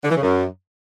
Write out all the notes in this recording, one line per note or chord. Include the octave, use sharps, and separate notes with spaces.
D3
E3
C#3
F#2